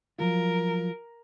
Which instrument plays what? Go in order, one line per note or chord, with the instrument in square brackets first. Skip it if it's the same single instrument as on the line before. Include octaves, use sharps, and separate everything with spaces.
[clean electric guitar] F3 F#3 F4 [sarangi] A#4